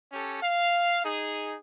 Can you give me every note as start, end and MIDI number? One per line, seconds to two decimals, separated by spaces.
0.12 0.42 61
0.12 0.42 67
0.12 0.42 69
0.12 0.42 73
0.43 1.03 77
1.05 1.57 63
1.05 1.57 68